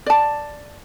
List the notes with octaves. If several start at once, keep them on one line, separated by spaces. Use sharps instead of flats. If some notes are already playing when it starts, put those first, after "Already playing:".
D5 A5